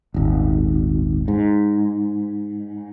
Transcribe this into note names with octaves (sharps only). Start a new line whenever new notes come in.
D#1 G#1
G#2